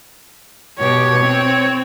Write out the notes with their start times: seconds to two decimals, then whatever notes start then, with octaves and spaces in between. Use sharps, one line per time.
0.79 B2 G4 C#5
1.19 C4